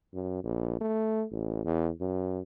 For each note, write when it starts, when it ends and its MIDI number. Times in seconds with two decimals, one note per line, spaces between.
0.13 0.41 42
0.44 0.78 34
0.81 1.25 57
1.31 1.62 33
1.65 1.90 40
2.00 2.39 42